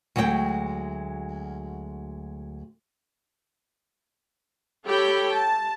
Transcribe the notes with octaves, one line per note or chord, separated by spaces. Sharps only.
D2 F#3 G#3 B4 G5
G4 A4 C#5 G5 B5
A5